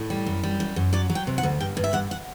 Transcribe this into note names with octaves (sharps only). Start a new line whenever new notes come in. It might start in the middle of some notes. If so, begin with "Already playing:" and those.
Already playing: A2
G3
F#2
G3
F#2
F#2
F#3 D5
F#3
G5
C3
F#5
D2
G2 G5
G2
E5
G2 F#5
F#5